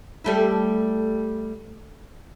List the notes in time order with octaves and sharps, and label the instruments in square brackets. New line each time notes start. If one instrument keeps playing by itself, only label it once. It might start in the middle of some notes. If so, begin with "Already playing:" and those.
[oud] G3 A3 E4